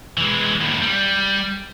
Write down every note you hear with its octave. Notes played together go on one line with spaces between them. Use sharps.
E3 G#3
D#2 A2
G3